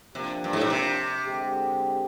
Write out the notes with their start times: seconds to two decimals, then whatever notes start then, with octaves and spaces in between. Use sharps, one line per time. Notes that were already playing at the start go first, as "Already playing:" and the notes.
0.14 C3 F3 A#3 D4 G4
0.44 G2
0.53 G#2
0.61 A#2
0.70 C3
1.25 D3 G#3 C4 G4